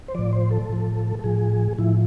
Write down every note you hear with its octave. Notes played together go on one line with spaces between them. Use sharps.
C5
A2 F3 D5
C5
A4
A2 F3
A4
A2 F3 G#4
A2 F3 E4